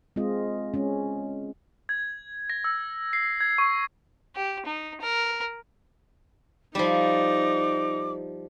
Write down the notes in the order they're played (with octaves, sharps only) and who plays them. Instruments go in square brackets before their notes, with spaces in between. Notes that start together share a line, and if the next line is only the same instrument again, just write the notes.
[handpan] G#3 C4 F4 D#5
G#3 C#4
[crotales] G#6
A#6
E6
C7
G#6
C#6
[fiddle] G4
D#4
A#4
[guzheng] F3 G3 [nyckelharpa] D#4 [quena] D6